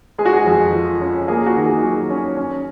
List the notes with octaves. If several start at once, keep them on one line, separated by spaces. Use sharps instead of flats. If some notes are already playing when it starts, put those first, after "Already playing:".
G#3 G#4
F#4
G#4
F2
F3
C#4
A#3 G#4
F#4
D#3
G#4
F#3
C#4
C#4